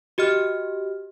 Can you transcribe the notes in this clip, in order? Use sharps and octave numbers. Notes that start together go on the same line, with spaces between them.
F#4 G4 D#5 F6